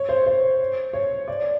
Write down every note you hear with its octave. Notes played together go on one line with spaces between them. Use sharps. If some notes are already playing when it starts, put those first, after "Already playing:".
Already playing: C#5
C5
C5
C#5
D5